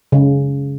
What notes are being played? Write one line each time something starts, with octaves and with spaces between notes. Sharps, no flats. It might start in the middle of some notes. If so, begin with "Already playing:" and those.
C#3